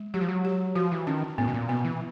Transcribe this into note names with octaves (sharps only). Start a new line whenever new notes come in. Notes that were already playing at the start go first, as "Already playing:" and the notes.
Already playing: G#3
F#3 G4
F3
F#3
G4
F3 F#4
E3
D#3 C#4
A2 B3
B2
A#2
B2 B3
E3